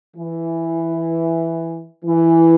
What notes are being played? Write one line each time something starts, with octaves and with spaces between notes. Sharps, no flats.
E3
E3